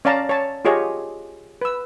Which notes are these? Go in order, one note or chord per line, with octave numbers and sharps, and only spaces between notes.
C#4 D5 F5 A5 A#5
C#5 A5
F4 G4 G#4 C#5 D#5
B4 E6